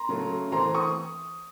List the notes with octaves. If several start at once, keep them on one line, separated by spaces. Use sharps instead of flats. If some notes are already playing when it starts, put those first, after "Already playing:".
Already playing: A#5 C6
C#3 F#3 A3
E3 A3 C4 A#5 C6
C#6 D#6